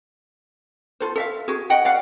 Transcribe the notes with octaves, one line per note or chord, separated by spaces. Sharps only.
F4 A4 C5
A4 E5 F5
F#4 G#4
D#5 F#5 G5
D5 F5 F#5